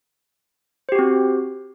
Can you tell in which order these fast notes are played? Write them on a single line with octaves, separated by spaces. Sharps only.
C5 G4 F#4 C4